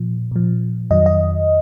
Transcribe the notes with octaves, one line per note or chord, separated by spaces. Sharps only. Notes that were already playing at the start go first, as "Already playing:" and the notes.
Already playing: A#2 F3
A#2 F3
F2 D#3 F#3 D#5
D#5